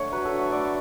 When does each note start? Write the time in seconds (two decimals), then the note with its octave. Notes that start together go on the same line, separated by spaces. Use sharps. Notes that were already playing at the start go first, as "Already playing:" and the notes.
Already playing: D3 A3 C#5
0.12 F#3 B4
0.25 A4
0.32 D3
0.39 E5
0.51 A3 D5